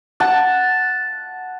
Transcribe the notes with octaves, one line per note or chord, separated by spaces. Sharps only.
F#5 A5